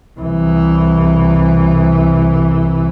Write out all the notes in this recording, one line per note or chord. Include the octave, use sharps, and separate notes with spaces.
C2 E3